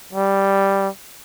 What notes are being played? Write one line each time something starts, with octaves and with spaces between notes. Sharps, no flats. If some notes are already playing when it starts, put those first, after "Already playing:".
G3